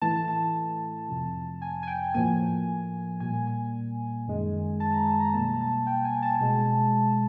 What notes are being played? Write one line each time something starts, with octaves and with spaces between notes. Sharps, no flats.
A2 E3 A3 A5
A5
F2 C3 F3
G#5
G#5
G5
A2 F3 A#3 G#5
A#2 G3 A#3 G#5
G#5
F#2 D#3 G#3
A5
A#5
A5
A#5
B2 G3 A#3 A5
A5
G5
G#5
A5
B2 G#3